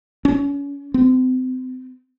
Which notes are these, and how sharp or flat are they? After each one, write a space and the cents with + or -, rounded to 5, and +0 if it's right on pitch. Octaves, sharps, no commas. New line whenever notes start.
C#4 +30
C4 -35